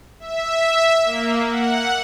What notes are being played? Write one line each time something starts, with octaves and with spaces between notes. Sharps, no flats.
E5
A#3
F#5